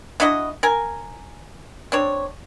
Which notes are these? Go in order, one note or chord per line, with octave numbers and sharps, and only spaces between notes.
D4 E4 F#4 D#5
A#4 G#5
C4 D4 C#5